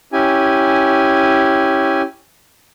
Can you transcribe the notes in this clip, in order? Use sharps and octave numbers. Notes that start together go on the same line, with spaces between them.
C#4 E4 G4 G#5